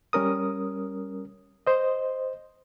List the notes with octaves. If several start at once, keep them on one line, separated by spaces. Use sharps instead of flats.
G3 C#4 A#4 D#6
C5 D#5